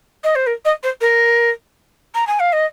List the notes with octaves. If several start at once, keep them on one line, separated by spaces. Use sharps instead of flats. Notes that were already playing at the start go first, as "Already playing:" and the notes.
D#5
C5
A#4
D#5
C5
A#4
A#5
G#5
F5
D#5